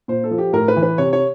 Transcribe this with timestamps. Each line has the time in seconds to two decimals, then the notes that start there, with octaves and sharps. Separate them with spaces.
0.08 A#2 C5
0.24 A4
0.31 F3
0.38 G4
0.53 A2 A#4
0.68 B4
0.76 E3
0.83 B4
0.98 C3 C#5
1.13 C#5